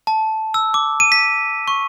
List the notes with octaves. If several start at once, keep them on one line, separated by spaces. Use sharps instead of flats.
A5
E6
D6
D#7
B6
C#6